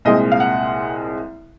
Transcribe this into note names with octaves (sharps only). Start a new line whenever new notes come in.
C2 A#2 G#3 C4 D#5
F5
F#5